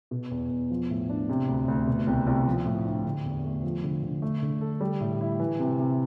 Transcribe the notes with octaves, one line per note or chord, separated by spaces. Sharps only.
B2
E2
E2
F3
A2
D4
C3
D2
D2
B2
C2
C2
F3
A2
D4
D3
E2
A3
F3
D3
D3
A3
D3
A4
G3
A2
E4
E3
C3
C3